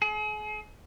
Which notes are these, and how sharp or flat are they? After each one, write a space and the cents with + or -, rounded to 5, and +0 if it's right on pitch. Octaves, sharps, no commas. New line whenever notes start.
G#4 +40